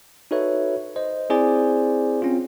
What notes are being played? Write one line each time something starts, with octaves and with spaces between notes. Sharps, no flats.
D#4 F#4 A4 B4 C#5 E5
C5 D#5
C4 E4 G#4 C5 D5 G#5
C4 C#4 F4